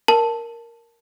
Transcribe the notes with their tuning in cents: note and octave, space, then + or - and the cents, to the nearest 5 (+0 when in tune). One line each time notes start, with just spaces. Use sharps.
A#4 +0 A5 +0